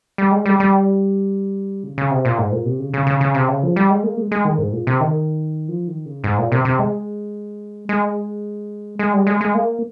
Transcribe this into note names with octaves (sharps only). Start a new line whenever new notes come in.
G3
G#3
G3
G3
C#3
C#3
C3
A#2
G#2
A#2
C3
C#3
C#3
C#3
C#3
C3
C#3
F3
G3
G#3
A#3
G#3
G#3
D#3
G#2
A#2
C3
D#3
F3
D#3
C#3
G#2
A#2
C3
C3
G#3
G#3
G#3
G3
G#3
G#3
A#3